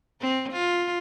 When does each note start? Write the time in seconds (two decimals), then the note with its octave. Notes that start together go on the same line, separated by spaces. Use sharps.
0.21 C4
0.52 F4